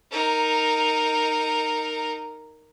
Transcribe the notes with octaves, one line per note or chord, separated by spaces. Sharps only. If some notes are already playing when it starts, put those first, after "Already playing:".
D#4 A#4